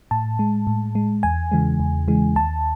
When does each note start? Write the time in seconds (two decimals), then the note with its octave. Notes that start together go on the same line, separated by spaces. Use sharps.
0.11 A2 A5
0.39 G#3
0.67 A2
0.95 G#3
1.23 E2 G#5
1.51 C#3 E3 G#3
1.80 E2
2.08 C#3 E3 G#3
2.36 D#2 A5